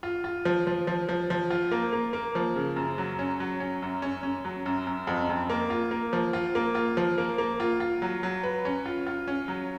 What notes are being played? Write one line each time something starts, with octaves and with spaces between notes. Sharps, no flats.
F4
F4
F3
F3
F3
F3
F3
F4
A#3
A#3
A#3
F3
C#3
F#2
F#3
C#4
F#3
C#4
F#2
C#4
C#4
F#3
F#2
F#2
F2
F2
A#3
F4
A#3
F3
F4
A#3
F4
F3
A#3
A#3
F4
F4
F#3
F#3
B4
C#4
F4
F4
C#4
F#3